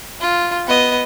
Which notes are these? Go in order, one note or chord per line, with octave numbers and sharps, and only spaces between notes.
F4
B3 D#5